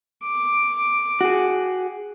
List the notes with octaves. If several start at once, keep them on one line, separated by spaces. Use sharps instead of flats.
D6
F#4 G#4